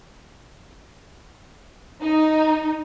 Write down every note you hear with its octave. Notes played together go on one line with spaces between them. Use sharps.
D#4